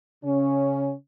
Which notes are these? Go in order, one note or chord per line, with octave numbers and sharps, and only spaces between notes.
C#3 C#4